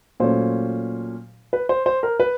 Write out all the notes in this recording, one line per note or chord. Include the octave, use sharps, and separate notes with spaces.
A#2 F#3 A3 C#4 C5
B4
C5
C5
A#4
B4